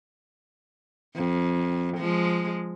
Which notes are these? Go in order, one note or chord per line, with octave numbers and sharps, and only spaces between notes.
F2
F3 G#3